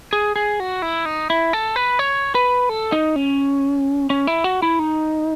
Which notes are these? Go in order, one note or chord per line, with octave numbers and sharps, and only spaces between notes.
G#4
G#4
F#4
E4
D#4
E4
A4
B4
C#5
B4
A4
D#4
C#4
C#4
E4
F#4
E4
D#4